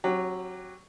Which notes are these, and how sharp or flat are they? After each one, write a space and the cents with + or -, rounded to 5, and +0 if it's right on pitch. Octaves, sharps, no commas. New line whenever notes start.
F#3 +0 C#4 -45 G4 +0